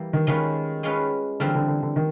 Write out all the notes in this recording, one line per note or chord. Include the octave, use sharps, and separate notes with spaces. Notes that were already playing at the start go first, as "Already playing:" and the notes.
Already playing: E3 G3 A#3
D#3
D#3 G#3 C#4 F4 G#4 B4
G#3 C#4 F4 G#4 B4
D3 E3 G3 C4 F4 A#4
D3
D3
D3
D#3